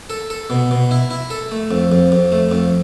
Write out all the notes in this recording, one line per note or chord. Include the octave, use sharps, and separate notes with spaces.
A4
A4
B2
B2
E4
E4
A4
A3
F2
F2
F2
A3
F2